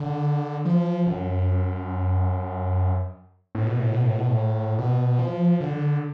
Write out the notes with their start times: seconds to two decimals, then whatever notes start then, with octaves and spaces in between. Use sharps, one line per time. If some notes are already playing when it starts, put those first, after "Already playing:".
Already playing: D3
0.65 F3
1.06 F#2
3.55 A2
3.67 B2
3.79 A2
3.91 B2
4.03 A2
4.15 B2
4.28 A2
4.79 B2
5.19 F3
5.60 D3